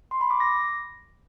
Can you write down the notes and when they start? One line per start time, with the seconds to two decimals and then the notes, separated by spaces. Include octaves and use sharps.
0.11 C6
0.21 B5
0.31 D6
0.40 A#6